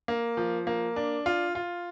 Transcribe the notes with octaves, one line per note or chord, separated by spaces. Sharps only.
A#3
F3
A#3
D4
F4
F4